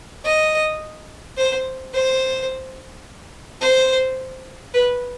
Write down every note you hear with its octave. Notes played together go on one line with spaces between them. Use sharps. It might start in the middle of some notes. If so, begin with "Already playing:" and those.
D#5
C5
C5
C5
B4